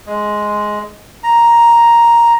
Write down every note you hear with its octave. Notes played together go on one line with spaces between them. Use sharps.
G#3
A#5